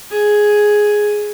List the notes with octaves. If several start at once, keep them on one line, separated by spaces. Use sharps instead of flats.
G#4